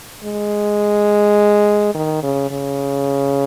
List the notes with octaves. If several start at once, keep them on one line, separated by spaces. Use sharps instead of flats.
G#3
D#3
C#3
C#3